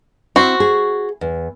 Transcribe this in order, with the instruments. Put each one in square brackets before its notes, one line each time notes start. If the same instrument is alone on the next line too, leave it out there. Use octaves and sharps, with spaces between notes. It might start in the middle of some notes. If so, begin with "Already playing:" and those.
[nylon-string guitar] C4 E4 [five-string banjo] F#4 C5
[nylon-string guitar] G#4
E2